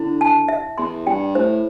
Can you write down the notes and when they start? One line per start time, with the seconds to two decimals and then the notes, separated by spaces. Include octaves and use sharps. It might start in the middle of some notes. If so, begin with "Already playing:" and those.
Already playing: D3 E4
0.21 A5
0.48 E5
0.78 E2 C6
1.06 G2 G5
1.35 A2 C5